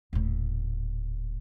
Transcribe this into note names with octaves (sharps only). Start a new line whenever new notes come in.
D#1 A2